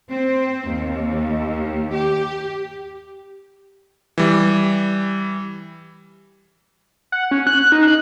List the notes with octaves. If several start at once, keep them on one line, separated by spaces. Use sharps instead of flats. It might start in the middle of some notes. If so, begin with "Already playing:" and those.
C4
D#2
G4
E3 G3
F#5
C#4
F#6
D#4
F#6